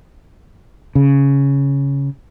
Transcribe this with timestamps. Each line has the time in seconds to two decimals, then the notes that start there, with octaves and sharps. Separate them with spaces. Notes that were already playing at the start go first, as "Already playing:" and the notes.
0.95 C#3